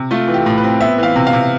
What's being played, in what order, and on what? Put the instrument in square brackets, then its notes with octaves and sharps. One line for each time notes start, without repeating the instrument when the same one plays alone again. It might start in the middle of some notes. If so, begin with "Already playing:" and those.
Already playing: [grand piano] C3
A3 F4
E3
G4
A2
B4
C4
B3 E5
E3 F5
C3
F5
C3